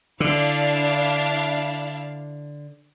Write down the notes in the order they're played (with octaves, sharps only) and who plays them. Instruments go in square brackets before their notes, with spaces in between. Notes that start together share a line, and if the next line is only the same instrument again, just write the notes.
[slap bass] D3 [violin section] D4 E4 F5